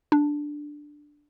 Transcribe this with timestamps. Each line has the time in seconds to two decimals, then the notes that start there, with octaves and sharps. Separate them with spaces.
0.12 D4